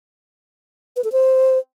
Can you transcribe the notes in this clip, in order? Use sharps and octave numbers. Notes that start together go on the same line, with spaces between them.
B4
A4
C5